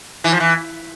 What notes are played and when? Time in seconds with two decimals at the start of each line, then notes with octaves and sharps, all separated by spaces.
0.24 E3
0.32 F3
0.40 E3